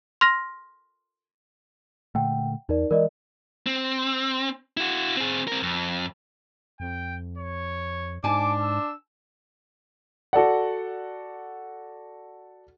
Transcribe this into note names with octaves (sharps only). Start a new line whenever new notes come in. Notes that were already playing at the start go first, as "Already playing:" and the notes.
C6 F6 A#6
A#2 D3 A3 F#5 G5
E2 D#4 A#4 D5
E3 G#3 A#4 D5 D#5
C4
E4 F#4
C4 G#4
C4 A#4
F2
F2 G5
C#5
G#2 D4 G#5 A5 D6
E6
F#4 A4 D5 F#5